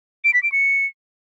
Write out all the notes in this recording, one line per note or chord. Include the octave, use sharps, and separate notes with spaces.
D7
B6
D7
C#7